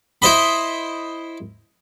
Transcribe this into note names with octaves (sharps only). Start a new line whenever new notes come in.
E4 C5 D#5 B5